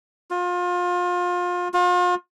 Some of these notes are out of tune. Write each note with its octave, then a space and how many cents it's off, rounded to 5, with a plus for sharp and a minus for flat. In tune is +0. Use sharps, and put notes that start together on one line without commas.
F4 +30
F4 +40